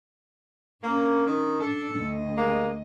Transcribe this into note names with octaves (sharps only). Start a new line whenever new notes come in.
A#3 C#4 D4
D#3
D4 A4
D2 D#5
G3 G#3 A#3